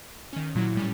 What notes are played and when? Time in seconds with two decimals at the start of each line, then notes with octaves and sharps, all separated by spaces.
0.33 D#3 C#4
0.55 A#2 F#3 E4
0.75 A2 G3 C#4